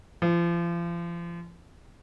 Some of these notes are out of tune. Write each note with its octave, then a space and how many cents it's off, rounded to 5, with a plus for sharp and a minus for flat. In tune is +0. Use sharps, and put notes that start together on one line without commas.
F3 -35